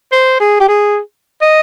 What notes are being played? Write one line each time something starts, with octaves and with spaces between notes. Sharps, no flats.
C5
G#4
G4
G#4
D#5